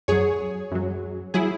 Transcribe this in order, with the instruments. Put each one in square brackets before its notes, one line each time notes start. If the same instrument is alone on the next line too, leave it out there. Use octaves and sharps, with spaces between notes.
[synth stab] F#2 F#3 G#4 C#5
F#2 F#3
F#3 E4 G#4